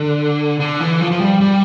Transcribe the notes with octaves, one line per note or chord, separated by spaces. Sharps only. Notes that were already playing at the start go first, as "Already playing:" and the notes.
Already playing: D3
D3
E3
F3
F3
G3
G3